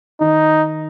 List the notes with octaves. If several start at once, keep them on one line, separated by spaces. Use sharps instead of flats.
D#3 D#4